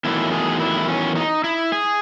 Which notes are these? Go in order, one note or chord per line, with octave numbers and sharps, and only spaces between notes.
E2 D#3 F#3 A3 E4
G#4
E4
C#4
D#4
E4
G#4